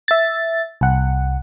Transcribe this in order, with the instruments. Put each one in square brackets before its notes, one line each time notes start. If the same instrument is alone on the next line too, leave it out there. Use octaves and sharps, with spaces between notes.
[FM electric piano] E5 A6
C2 F#5